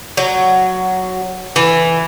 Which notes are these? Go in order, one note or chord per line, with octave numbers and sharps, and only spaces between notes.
F#3
E3